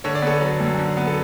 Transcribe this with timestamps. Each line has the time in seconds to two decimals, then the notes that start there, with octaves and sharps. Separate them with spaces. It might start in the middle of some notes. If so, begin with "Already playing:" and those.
0.04 D3 C#5
0.15 D5
0.22 B3 A4 C#5
0.41 F#3
0.60 F#2
0.79 D3
0.97 B3
1.07 A4